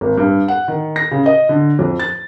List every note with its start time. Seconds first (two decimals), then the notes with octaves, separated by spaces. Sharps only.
0.01 G#1
0.18 G2
0.48 F#5
0.68 D#3
0.96 A#6
1.11 C#3
1.26 D#5
1.49 D3
1.79 F2
1.99 A6